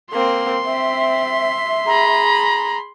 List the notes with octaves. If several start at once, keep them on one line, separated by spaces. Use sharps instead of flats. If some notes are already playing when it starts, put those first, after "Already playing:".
A#3 C4 C6
C4 E5
G#4 A#5 B5